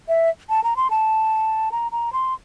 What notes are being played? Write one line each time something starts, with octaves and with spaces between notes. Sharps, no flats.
E5
A5
A#5
C6
A5
A#5
A#5
C6